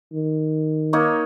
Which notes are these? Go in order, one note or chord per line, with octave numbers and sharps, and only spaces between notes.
D#3
A#3 D#4 C#5